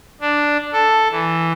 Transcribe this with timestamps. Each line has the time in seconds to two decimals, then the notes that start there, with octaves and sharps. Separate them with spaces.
0.21 D4
0.73 A4
1.11 E3